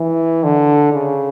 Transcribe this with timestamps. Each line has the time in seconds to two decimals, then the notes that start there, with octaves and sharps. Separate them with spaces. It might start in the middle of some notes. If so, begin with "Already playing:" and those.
Already playing: E3
0.44 D3
0.93 C#3